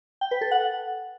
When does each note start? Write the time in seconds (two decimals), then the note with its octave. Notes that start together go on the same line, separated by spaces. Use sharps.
0.21 G5
0.31 B4
0.41 A4
0.51 F#5